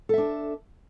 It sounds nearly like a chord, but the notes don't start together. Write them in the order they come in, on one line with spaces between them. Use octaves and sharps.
A4 E5 D4